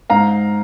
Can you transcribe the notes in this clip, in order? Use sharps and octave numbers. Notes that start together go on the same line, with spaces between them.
G#2 F5 A#5